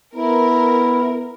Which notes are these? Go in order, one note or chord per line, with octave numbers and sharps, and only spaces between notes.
B3 E4 A#4